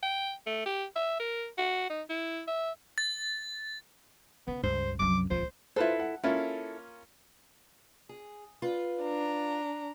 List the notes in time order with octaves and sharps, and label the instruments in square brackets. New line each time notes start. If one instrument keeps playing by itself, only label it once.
[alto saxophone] G5
A3
G4
E5
A#4
F#4
D#4
E4
E5
[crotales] A6
[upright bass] C#3 [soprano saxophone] B3
[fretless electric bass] C#2 G2 [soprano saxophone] C5
[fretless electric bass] C2 F#2 [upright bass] F3 F#3 [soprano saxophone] D6
[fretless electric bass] D#1 F3 [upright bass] C#2 [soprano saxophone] C5
[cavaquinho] E4 A4 [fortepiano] F4 B4 C5
[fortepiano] F#5
[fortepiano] A#3 C#4 F4 [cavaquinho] E4 A4
[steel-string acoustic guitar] G#4
F4 B4
[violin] D4 A#5